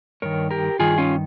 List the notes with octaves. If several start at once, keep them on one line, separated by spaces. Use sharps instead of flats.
G2 D#3 A#4 C#5
G4 A#4
G2 D#3 F4 G#4
C#4 F4